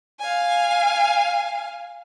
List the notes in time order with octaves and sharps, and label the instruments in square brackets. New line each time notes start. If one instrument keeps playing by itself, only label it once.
[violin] F5 G#5